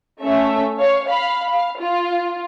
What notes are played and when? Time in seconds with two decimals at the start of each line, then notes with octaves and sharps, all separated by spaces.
0.21 A3 C#4 E5
0.79 C#5 F5
1.08 F5 B5
1.50 F5
1.81 F4